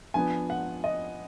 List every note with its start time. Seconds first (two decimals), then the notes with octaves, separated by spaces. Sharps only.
0.14 F3 B3 D4 G#5
0.50 F#5
0.84 D#5